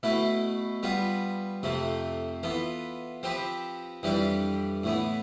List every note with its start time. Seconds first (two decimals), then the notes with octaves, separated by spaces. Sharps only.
0.03 B2 A3 E4 B4
0.83 G3 B3 F4 B4
1.63 F2 C3 F3 A3
2.43 E3 B3 F4 A4
3.23 F3 C4 G4 B4
4.03 F2 E3 G3 D4 G4
4.83 A2 E3 B3